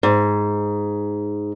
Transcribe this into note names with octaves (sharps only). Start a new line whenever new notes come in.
G#2